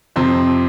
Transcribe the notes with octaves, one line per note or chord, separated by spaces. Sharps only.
F2 C3 F3 C4